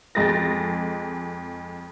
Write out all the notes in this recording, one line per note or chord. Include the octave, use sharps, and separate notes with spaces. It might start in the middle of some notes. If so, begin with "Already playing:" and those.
F2 G#3 A6 A#6